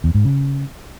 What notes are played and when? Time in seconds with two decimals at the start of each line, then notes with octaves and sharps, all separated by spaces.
0.04 E2
0.14 G#2
0.25 C#3